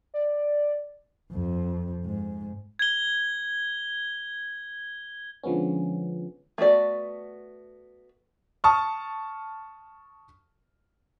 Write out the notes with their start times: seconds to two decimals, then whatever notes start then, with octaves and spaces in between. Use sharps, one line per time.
0.14 D5
1.33 F2
2.05 G#2
2.79 G#6 G7
5.43 D3 F3 G#3 B3 C#4
6.58 A3 B3 F#4 D5
8.64 A5 C#6 D#6 F6